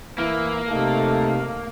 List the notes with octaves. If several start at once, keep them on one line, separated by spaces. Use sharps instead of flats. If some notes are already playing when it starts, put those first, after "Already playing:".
E3 A#3 E4
C3 A3 D#4 A4 F5